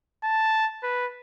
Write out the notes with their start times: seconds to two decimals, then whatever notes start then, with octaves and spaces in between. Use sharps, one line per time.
0.24 A5
0.84 B4